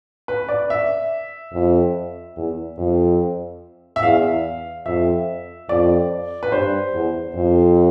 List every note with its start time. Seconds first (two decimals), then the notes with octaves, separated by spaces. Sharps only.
0.28 B4
0.49 D5
0.70 E5
1.53 F2
2.36 E2
2.78 F2
3.96 E5
4.03 E2 F5
4.86 F2 E5
5.69 F2 D5
6.43 B4
6.52 G2 C5
6.94 E2
7.35 F2